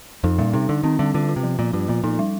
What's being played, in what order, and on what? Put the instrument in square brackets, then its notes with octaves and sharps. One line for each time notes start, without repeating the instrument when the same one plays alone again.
[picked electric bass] F2 [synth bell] D#4
[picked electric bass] A#2 [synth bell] G3
[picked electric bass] C3 [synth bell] D#4
[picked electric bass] D3 [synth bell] D#4
[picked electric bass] D#3 [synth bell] C4
[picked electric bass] D3 [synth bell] G3
[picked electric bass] D3 [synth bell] F4
[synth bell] F4
[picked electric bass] C3
[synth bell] F3
[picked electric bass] A#2 [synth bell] F3
[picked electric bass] G2 [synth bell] F4
[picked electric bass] A#2 [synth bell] F3
[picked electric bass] A#2 [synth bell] D#4
[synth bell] G3